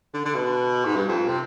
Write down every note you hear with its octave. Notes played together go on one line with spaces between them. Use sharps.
D3
D3
B2
G#2
G2
F2
C3